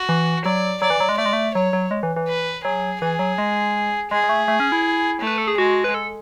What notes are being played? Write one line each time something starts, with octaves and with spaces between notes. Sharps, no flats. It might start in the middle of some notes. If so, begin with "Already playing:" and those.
Already playing: F#4
E3
F#3 D5
F#3 D5
E3
F#3
G#3
A3 D5
G#3
A3
F#3 C#5
F#3
G#3
E3
E3
B4
F#3 G#4
E3 G#4
F#3
G#3
G#3 G#4
G#3
A3
A3
C#4
E4
A3
B4
A4
G#4
G#3 F#4
B4
A4